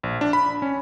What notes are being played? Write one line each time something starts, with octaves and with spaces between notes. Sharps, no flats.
A#1
D4
B5
C#4